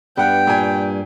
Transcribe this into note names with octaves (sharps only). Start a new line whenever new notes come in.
G2 G3 B3 F#5 G5
A#2 G#5